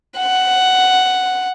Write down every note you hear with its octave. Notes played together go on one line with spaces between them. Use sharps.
F#5